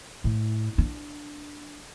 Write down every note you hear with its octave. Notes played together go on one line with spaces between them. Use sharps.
A2
D4